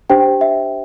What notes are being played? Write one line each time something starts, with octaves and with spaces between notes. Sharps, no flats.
D4 G4 C5 G5
E5